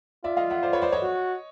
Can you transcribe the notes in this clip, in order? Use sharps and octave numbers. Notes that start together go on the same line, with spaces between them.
F4 D5 E5
D#5 F5
E5 F#5
C5 D5
B4 C#5
C5 D5
C#5 D#5
F#4